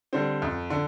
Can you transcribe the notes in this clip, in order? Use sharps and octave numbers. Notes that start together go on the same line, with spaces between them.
D3 G3 C4
F2
D3